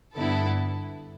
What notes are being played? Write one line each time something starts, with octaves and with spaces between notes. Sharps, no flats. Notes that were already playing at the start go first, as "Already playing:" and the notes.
G2 D3 B3 E4 A4